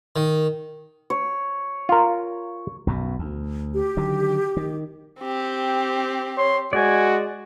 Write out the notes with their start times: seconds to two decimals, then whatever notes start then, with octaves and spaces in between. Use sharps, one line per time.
0.16 D#3
1.10 C#5
1.89 F4 A#4
2.87 B1 F#2 B2
3.19 D2
3.74 G4
3.97 D3 D#3 F#3
4.57 D#3
5.21 C4 G4
6.38 C#5 C6
6.73 G#3 F#4 D5 G#5